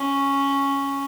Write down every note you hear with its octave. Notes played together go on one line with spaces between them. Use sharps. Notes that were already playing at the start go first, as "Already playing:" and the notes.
Already playing: C#4